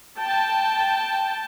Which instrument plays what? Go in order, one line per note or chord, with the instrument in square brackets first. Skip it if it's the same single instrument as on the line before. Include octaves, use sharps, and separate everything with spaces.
[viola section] G5 A5